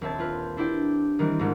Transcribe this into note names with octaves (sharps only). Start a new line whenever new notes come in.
D#1 C4 E5 A5 G#6
C4 F4 B4
D4 E4 G4 D5 G5
D#3 E3 G3 C4
G#1 G#2 D#3